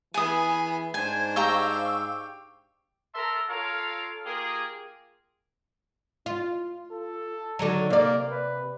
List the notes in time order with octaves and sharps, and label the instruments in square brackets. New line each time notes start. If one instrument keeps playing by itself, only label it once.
[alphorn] E3 [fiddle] B3 G#4 [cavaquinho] G#5 D#6
[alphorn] G#2 [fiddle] D4 C5 [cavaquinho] G#5 [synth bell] G#6
[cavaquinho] G4 G5 A#5 [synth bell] F5 C#6 E6
[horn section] A4 A#4 E5 A5 A#5 C6
F4 A4 A#4 C#5 F5
A#3 F4 G4 G#4
[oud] F4
[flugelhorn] A4
[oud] D3 D#3 F#3
[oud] C3 D5 [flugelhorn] A#3
[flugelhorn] B4